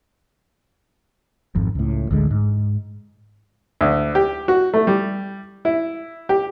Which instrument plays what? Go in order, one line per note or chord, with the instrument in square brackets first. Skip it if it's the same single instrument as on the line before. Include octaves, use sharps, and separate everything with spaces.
[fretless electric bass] G#1 F2
C#2 A2
A1 D2 D3 G#3
G#2
[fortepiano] D2
G4
F#4
A3
G3
E4
G4